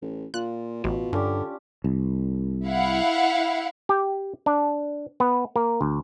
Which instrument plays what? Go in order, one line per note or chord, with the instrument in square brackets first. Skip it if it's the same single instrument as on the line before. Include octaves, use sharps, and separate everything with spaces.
[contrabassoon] A1
[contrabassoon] A#2 [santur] F4 [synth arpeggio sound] F#6
[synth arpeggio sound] A1 [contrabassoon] B2
[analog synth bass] G2 [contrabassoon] D3 [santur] C#4 D4 G4
[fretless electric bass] C2
[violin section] E4 F5 F#5
[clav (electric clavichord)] G4
D4
B3
A#3
D2